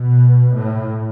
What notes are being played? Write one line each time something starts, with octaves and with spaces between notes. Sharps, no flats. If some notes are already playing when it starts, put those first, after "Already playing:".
Already playing: B2
A2